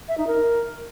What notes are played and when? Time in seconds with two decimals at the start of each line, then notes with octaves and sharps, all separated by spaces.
0.09 E5
0.18 D#4
0.27 A#4